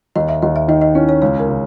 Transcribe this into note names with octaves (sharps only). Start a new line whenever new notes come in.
D#2 D#5
E5
D#2 D#5
E5
D#3 D#5
D#5
C#4 E4
C#5
C#2 C#5
A#4
C#3